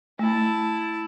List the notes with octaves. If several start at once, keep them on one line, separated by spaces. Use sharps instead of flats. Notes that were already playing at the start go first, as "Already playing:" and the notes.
A3 E4 A5